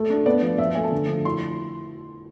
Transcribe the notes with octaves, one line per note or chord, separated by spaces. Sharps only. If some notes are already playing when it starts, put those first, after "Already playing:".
Already playing: A3
D4
B3 D5
F3
F3 E5
A3 G#5
A5
D3
F3
E4 C6